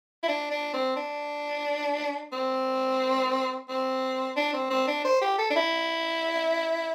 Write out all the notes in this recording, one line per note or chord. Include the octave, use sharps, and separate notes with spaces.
E4
D4
D4
C4
D4
C4
C4
D4
C4
C4
D4
C5
G4
A4
D4
E4